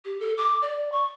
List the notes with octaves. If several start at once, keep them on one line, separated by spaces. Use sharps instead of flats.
G4
A4
D6
D5
C#6